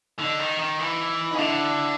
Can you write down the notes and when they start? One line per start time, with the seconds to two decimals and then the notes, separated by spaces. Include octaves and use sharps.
0.19 D3 D#4
0.39 D#3
0.59 D#3
0.79 E3
1.31 D#4
1.34 C#3
1.38 D3 D4 E4